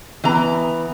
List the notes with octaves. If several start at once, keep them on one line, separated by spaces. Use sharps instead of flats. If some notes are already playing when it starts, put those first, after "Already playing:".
E3 B3 A#5